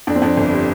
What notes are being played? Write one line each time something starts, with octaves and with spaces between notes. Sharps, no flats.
F2 D4
C4
F2 D4
G1
G3